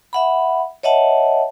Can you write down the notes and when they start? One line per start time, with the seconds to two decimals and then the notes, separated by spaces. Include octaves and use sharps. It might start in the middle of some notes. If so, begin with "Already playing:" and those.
0.13 E5 F#5 B5
0.83 C#5 D#5 E5 F#5 A5